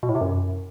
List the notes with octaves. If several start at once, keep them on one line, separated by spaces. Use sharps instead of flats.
B2
A2
C3
F#2